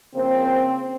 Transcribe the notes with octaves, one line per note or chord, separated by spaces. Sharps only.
C#3 F3 A#3 C4